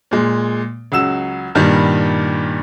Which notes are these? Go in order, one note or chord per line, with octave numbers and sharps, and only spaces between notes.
A#2 G#3
C#2 F#3 E6 E7
G2 A#2 D#3 G3